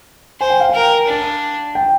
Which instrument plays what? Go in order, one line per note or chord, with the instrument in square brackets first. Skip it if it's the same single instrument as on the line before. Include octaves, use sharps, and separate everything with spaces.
[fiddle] C5 [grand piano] G#5
[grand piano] G5
F5
[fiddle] A#4 [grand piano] G5
[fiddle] D4
[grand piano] G5